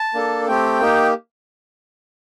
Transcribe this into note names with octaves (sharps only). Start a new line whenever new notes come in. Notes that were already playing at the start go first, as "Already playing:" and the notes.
Already playing: A5
A#3 D4 A4
A3 C4 G4 G5
A#3 D#4 G4